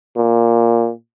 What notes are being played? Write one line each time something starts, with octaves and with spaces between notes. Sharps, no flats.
A#2